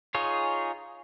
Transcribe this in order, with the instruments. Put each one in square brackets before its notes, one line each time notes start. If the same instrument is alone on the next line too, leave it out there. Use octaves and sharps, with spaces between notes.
[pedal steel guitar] D#4 F4 G#4 C#5